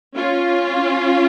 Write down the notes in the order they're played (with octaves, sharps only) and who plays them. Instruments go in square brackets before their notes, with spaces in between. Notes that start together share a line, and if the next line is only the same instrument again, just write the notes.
[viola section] C#4 F4